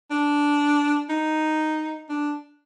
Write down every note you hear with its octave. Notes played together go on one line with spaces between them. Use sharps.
D4
D#4
D4